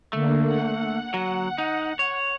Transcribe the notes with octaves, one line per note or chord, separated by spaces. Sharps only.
D3 A3 A#3
F#5
F#3
D#4
C#5